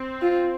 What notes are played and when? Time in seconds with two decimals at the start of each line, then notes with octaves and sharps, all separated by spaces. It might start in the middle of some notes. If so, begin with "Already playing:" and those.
Already playing: C4
0.22 F4